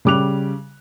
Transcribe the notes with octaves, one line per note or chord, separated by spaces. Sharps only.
C#3 G3 D6 F#6 F7